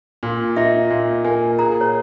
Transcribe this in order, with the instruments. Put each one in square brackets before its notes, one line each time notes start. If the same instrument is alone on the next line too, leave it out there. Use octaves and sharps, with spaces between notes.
[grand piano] A#2
[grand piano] D#4 [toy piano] E5
[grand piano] A#2
[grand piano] A#3 [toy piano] G#5
[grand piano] G#4 [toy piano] A#5
[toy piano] C#5